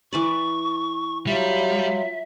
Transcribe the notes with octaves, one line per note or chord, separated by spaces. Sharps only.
E3 B4 D5 C#6
F#3 G3 F4 E5